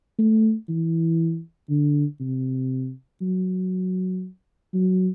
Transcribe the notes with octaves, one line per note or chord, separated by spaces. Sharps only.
A3
E3
D3
C3
F#3
F#3